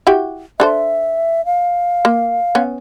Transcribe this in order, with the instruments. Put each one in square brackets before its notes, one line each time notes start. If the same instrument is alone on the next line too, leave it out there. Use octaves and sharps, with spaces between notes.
[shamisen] E4 F#4 G4
[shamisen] D4 A4 C5 [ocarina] E5
[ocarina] F5
[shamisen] A#3
B3 C#4